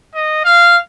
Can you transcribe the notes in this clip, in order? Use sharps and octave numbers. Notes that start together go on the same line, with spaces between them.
D#5
F5